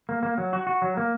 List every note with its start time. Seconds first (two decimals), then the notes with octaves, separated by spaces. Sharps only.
0.09 A#3
0.23 A#3
0.38 F#3
0.53 F#4
0.67 F#4
0.82 F#3
0.97 A#3